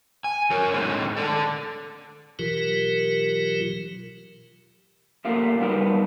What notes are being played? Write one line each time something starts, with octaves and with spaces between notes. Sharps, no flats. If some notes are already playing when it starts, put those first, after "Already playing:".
G#5
F#3 A#4 C#5
A2 D3 G#3 C4 D#4
A4 D5 G#5 A5
B2 E3 F#3 F4 G4 A#4
A3 A#3 F4 G4 A#4
F#3 G3 B3 D#4 A#4